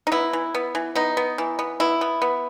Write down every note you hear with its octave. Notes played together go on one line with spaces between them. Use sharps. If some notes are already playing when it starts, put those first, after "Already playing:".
D#4
B3 E4
E3
B3
E3
B3 D#4
B3
E3
B3
B3 E4
B3
B3